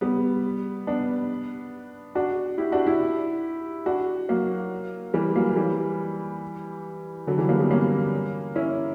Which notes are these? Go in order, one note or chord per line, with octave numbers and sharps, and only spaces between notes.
G3 B3
B3 D4
D4 F#4
E4 G4
D4 F#4
E4 G4
D4 F#4
F#3 A#3
E3 G3
F#3 A#3
E3 G3
D3 F#3
E3 G3
F#3 A#3
G3 B3
A#3 C#4
C#4 E4